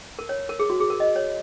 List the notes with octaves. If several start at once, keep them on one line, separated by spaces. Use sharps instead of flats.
A#4
C#5
A#4
G#4
F#4
G#4
A#4
D#5
C#5